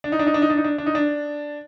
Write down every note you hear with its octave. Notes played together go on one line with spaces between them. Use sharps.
D4
D#4
D4
D#4
D4
D#4
D4
D#4
D4
D4
D#4
D4